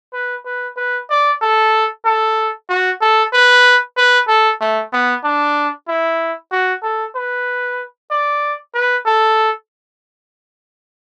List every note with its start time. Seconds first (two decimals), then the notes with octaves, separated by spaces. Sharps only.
0.14 B4
0.45 B4
0.77 B4
1.10 D5
1.42 A4
2.05 A4
2.69 F#4
3.01 A4
3.33 B4
3.97 B4
4.28 A4
4.61 A3
4.93 B3
5.24 D4
5.88 E4
6.52 F#4
6.83 A4
7.15 B4
8.11 D5
8.74 B4
9.06 A4